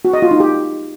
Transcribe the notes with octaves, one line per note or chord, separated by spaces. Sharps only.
F#4
D#5
F4
D#4
G4